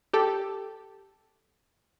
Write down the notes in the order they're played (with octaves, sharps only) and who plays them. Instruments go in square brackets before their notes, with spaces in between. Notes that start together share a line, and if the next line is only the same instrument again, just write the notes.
[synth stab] G4 A4